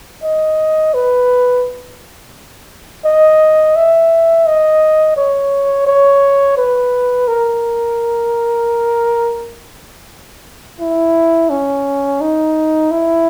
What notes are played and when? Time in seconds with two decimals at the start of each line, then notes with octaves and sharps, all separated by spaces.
0.23 D#5
0.94 B4
3.05 D#5
3.76 E5
4.46 D#5
5.16 C#5
5.87 C#5
6.57 B4
7.28 A#4
10.80 E4
11.50 C#4
12.21 D#4
12.91 E4